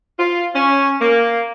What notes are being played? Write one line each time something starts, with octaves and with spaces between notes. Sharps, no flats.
F4
C#4
A#3